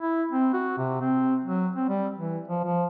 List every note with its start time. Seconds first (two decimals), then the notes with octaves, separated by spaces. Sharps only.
0.01 E4
0.32 C4
0.53 F#4
0.78 C3
1.01 C4
1.45 F#3
1.76 C4
1.89 G3
2.18 E3
2.48 F3
2.64 F3